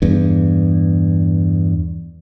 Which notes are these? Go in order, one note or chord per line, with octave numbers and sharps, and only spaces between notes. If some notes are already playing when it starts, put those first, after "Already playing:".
E2 G2